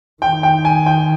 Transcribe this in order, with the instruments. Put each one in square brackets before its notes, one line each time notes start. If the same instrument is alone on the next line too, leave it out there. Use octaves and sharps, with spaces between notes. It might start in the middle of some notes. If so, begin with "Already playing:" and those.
[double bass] D#3 [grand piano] G5
[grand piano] G5
G#5
G5